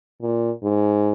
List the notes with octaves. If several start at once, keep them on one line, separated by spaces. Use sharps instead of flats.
A#2
G#2